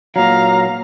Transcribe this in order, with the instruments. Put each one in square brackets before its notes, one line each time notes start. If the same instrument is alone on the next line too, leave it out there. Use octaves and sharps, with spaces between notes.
[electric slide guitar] A#2 F#3 [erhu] F5 [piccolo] A#5